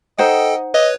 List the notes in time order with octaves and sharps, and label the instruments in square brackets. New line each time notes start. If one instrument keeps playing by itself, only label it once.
[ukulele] D#4 C5 F#5 [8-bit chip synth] A4 G5 [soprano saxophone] D#5
[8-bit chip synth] B4 C#5 [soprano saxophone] D#5